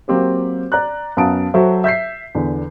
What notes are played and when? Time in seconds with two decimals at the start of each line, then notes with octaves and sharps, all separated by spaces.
0.08 F#3 A#3 C4 G4 C5
0.72 D5 A#5 F#6
1.17 F#2 B3 F5 A5 D#6 D7
1.54 F#3 F#4 A4 C5 E5
1.84 E5 G6 B6 C7
2.35 E2 D3